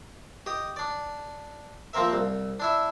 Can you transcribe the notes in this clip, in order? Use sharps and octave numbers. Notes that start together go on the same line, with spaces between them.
G4 D#5
D4 D5
F3 A#3 C4 A#4 E5
C2
D4 E4 E5